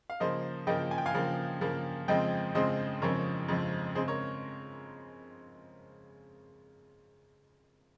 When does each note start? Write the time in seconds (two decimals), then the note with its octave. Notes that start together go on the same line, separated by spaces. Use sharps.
0.10 F5
0.20 C#3 F3 A#3 C5 D#5
0.67 C#3 F3 A#3 D#5 G5
0.91 G#5
0.98 G5
1.06 F5 G#5
1.14 C#3 F3 A#3
1.61 C#3 F3 A#3
2.08 F2 C#3 F3 G#3 C4 D#5 G5
2.55 F2 C#3 F3 G#3 C4 C5 D#5
3.02 F2 C#3 F3 G#3 C4 A#4 C#5
3.49 F2 C#3 F3 G#3 C4
3.95 C#3 G#3 C4 G#4 C5
4.08 A#4 C#5